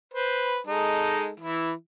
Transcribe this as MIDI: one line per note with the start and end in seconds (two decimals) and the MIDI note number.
0.14 0.58 71
0.14 0.58 72
0.67 1.30 56
0.67 1.30 63
0.67 1.30 69
1.40 1.72 52
1.40 1.72 64